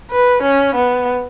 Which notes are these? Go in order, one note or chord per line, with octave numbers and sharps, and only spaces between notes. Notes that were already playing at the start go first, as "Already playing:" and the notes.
B4
C#4
B3